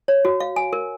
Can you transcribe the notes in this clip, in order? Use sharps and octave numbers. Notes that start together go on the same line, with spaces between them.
C#5
F#4
F5
G#5
A#4